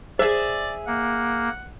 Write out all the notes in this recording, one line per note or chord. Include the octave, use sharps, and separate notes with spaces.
G#4 C5 D5 E5
A#3 F#5